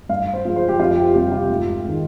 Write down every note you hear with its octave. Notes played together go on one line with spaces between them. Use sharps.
G2 F5
C5
F3 G#3
C5
G4
F2 F4
G4
C3 G3 G4
F4
G#2
D#3 G#3